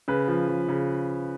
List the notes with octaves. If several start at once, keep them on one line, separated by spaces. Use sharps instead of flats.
C#3 B4
F3
F3
C#3